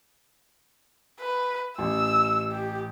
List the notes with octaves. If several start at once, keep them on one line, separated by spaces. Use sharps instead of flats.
B4
A1 E6
G4